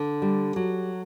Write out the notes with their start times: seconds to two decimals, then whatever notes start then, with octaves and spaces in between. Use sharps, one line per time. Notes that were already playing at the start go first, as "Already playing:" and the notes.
Already playing: D3
0.22 G3
0.56 F#3